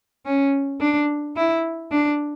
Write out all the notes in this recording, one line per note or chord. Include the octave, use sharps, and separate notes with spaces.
C#4
D4
E4
D4